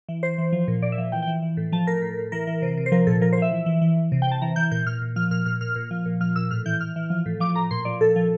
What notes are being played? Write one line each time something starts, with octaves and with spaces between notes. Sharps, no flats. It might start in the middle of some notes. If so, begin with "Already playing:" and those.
E3
E3 C5
E3
F3
A#2
A#2 D5
E5
F3
E3 G5
G5
E3
E3
A2
F3 A5
A2 A#4
A2
A2
E3 A#4
E3
C3
C3
C5
F3 A#4
A#2 A4
F3 A#4
C5
F3 E5
E3
E3
E3
E3
C3
G5
C3 A5
E3 A#5
E3 G6
A#2 G6
A#2 F6
A#2
F3 F6
A#2 F6
A#2 F6
A#2 F6
A#2
F3
A#2
F3 F6
A#2 E6
A2 F6
E3 G6
E3 F6
E3
F3
A2
F3 D6
A2 A#5
A#2 C6
F3 D5
A#2 A4
F3